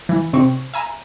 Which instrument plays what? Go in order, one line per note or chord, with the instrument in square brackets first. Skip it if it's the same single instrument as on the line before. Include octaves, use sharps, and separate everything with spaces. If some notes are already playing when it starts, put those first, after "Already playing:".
[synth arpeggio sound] E3
C3 C4 C#6
E5 G#5 A#5